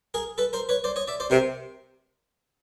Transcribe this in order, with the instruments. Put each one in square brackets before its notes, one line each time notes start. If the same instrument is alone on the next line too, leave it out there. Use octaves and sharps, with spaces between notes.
[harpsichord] G#4 A#4
A4 B4
A#4 C5
B4 C#5
C5 D5
C#5 D#5
D5 E5
C5 D5
[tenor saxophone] C3 [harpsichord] A#4 C5